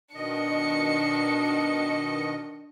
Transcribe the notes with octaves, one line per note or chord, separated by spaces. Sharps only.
B2 D#3 D4 D#5 C#7